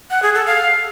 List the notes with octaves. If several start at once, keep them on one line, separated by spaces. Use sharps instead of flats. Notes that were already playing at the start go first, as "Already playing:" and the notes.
F#5
G#4
A4
F5